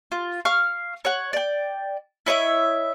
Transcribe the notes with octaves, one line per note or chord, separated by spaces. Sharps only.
F4
F5 C#6 F6
C#5 F#5
D5 G5
E4 C#5 D#5 E5